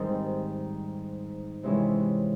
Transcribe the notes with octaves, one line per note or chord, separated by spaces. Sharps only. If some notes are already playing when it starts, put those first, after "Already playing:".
Already playing: G#2 D#3 G3 C4
C3 E3 G#3 C#4 E4